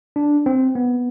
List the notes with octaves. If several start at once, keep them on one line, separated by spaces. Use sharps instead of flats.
D4
C4
B3